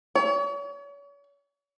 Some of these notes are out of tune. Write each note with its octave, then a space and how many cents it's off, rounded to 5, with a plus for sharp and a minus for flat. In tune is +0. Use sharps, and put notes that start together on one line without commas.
C#5 +40